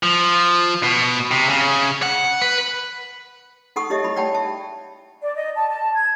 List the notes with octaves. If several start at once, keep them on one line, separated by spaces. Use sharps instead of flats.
F3
B2
C3
C#3
F#5
B4
D#4 A4 F#5 B5 C#6 D#6
D#4 G4 C#5 D#5 E5
E4 B5
C#5 D5 F#5 G5 A5 B5
E5 A5
D5
D#5
A5
A5
G#6